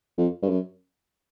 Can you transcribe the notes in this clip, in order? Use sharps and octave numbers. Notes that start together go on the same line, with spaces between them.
F2
G2
F#2